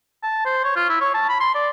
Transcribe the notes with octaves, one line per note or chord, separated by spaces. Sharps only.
A5
C5
C#5
F4
E4
C#5
A5
B5
C6
D5